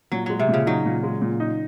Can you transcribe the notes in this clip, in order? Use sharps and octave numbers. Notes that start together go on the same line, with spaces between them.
A#2 F#3
F#3 G#3
C3
A#2
C#3
F#3 D#4
A#2
G#3
A#2
D#4